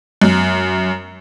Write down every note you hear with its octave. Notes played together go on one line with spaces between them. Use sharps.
F#2